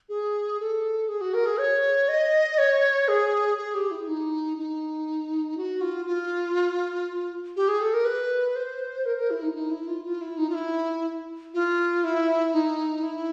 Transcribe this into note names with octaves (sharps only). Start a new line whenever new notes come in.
G#4
A4
G#4
F#4
A#4
G#4
C#5
D#5
C#5
G#4
G#4
G4
E4
D#4
D#4
F#4
F4
F4
G4
G#4
A4
A#4
B4
C5
A#4
A#4
E4
D#4
D#4
E4
F4
F4
E4
D#4
F4
E4
F4
E4
D#4
E4